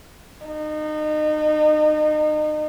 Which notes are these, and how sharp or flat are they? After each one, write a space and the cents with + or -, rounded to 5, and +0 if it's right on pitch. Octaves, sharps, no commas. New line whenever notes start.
D#4 -30